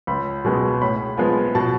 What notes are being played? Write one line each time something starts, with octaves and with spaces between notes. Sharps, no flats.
C#2 B5
B2 G#3 B3
A2 B5
F3 G#3 B3
B2 A5